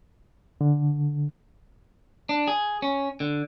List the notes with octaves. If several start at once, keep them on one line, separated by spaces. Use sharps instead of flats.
D3
D4
G#4
C#4
D3